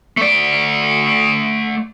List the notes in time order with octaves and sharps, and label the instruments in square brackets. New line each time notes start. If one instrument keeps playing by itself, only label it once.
[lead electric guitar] A3 D5